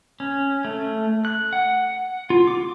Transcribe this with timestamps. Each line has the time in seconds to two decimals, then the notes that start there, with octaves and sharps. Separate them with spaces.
0.20 C#4
0.65 A3
1.25 F#6
1.53 F#5
2.30 F4
2.48 D6